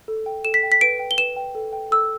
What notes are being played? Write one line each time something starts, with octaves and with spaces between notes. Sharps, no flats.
A4
G5
A4 E7
B6
G5
B6
B4 D7
G5
G7
B4 E7
G5
A4
G5
A4 E6